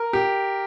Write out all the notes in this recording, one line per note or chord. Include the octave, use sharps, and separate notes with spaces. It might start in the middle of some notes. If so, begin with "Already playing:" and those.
Already playing: A#4
G4